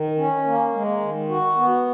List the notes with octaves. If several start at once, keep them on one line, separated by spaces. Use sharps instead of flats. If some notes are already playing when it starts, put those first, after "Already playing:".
Already playing: D#3
C#4
A#3
G#3
D#3
F#4
B3